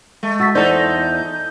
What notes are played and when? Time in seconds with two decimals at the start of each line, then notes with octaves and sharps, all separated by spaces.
0.23 G#3 A3
0.40 F#4 E6 A6 B6
0.55 E2 D#4 A4 C5 D5 G6